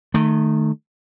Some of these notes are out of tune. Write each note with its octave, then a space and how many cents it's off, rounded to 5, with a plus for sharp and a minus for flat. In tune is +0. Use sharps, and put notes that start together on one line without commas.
D#3 -25 A3 +0